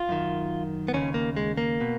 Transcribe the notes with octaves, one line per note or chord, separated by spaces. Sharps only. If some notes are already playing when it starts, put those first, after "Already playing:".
Already playing: F4
F#2 D#3
B3
D#2 C#3 C#4
A#3
G#3
A#3
B2